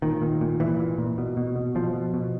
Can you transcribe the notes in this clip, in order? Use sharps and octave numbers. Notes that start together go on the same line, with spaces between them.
A#2 D#3
A#2
A#2
A#2 E3
A#2
A#2
B2
B2
B2
B2 F3
B2
B2